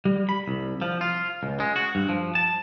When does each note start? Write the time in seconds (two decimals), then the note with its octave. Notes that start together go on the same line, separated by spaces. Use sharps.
0.05 G3
0.29 B5
0.48 C2
0.82 F3
1.01 F4
1.43 C#2
1.60 G#3
1.76 F#4
1.95 G2
2.09 F3
2.35 A5